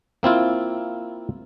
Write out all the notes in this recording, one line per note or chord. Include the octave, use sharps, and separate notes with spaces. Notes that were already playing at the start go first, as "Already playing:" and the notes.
A#3 C4 E4 F4